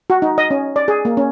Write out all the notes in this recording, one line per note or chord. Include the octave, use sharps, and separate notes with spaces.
F#4
D#4
D#5
C#4
D5
G#4
A#3
C#4